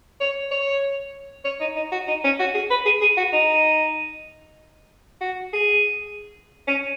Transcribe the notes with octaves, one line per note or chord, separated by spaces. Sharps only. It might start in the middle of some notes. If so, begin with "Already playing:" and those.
C#5
C#5
C#5
D#4
D#4
F#4
D#4
C#4
F#4
G#4
B4
G#4
G#4
F#4
D#4
F#4
G#4
C#4